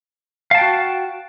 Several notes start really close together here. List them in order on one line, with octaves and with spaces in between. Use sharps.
F5 A5 G5 F#4